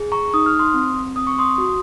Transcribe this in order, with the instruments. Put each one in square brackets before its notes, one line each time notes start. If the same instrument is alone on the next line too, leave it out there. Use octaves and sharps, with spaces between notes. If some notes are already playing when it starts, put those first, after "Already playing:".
Already playing: [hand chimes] G#4
A#5 C#6
D#4 D#6
F6
C6 D#6
C4
C4 D#6
C#6
C6 D#6
F#4